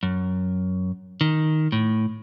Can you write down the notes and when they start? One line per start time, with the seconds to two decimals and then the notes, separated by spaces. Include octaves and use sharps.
0.03 F#2
1.21 D#3
1.72 A2